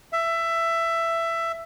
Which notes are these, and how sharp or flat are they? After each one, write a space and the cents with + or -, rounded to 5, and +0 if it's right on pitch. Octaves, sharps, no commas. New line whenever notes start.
E5 +15